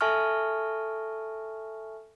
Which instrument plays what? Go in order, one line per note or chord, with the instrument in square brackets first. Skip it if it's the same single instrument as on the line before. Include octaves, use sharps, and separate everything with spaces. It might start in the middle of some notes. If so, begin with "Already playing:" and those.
[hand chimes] A4 E5 G#5 A5 C#6 F6